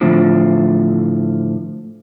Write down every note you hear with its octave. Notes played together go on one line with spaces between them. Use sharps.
A2 D3 F3